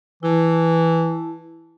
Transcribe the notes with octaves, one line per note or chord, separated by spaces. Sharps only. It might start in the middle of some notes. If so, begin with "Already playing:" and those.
E3 E4 A5